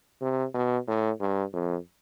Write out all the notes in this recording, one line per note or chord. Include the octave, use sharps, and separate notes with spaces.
C3
B2
A2
G2
F2